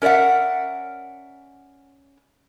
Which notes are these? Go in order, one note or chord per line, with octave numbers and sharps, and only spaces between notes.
C#4 A#4 D5 E5 F#5